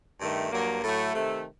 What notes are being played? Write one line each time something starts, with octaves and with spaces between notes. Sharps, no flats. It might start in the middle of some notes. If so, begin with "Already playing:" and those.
G2 D#3 A3
G2 F#3 A#3
A2 F#3 A3
C3 D#3 A3